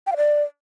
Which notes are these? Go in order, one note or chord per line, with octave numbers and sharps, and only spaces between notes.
G5
F5
D5